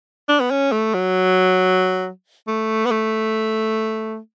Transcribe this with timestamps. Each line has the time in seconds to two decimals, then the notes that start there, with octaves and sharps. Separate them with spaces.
0.29 D4
0.40 B3
0.51 C#4
0.72 A3
0.94 F#3
2.47 A3
2.86 B3
2.91 A3